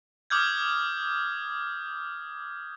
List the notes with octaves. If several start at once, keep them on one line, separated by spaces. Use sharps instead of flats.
D6 D#6 F6 G6 G#6